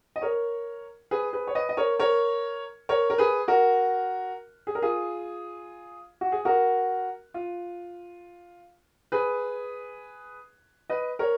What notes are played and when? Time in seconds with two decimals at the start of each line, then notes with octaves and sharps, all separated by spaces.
0.16 D#5
0.22 A#4 C#5
1.11 G#4 B4
1.33 G#4 B4
1.47 C#5
1.55 B4 D#5
1.69 D#5
1.77 A#4 C#5
2.00 A#4 C#5
2.89 A#4 C#5
3.10 A#4
3.18 G#4 B4
3.48 F#4 A#4
4.67 G#4
4.75 A#4
4.82 F4 G#4
6.21 F#4
6.32 G#4
6.45 F#4 A#4
7.34 F4
9.12 G#4 B4
10.90 B4 D#5
11.19 A#4 C#5